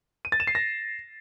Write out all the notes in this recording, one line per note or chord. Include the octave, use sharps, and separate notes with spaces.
D#7
A6
E7
C7
A#6